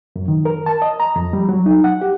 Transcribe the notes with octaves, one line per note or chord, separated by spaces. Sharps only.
F#2
D#3
A#4
A5
D#5
A#5
F2
G3
F#3
D#4
F#5
G4